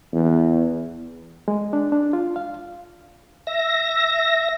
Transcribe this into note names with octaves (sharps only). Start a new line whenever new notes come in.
E2
G#3
D4
D4
F4
F5
E5 A#6